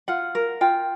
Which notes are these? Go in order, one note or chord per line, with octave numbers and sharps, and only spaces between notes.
F4 F#5
A#4
F4 G5